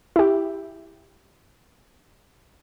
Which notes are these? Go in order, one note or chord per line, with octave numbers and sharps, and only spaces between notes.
E4 G4